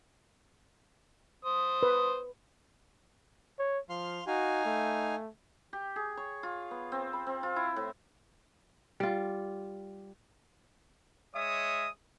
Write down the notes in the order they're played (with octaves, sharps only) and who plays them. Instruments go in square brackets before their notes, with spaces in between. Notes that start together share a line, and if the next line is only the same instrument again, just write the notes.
[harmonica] C5 D#6
[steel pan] B4
[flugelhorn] C#5
[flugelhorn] F3 [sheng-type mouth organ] F5 C6 F6
[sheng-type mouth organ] D#4 F5 G#5 [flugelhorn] F#4
[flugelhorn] A3
[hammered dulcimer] G4
G#4
C#5
F4
B3
C4
B5
C4
F4
E4
A2
[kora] G3 F4
[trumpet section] G#3 C#5 D#5 E5 D#6